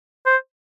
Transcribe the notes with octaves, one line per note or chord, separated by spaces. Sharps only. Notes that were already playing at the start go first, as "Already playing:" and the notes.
C5